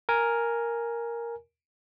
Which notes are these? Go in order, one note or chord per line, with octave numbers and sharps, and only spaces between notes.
A#4 G#5